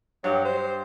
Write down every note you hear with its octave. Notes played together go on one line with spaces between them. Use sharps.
G2 F#3
C5